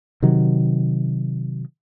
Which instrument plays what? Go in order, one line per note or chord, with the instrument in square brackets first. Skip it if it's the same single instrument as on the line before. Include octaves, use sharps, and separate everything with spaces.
[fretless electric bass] C3 D#3 F#3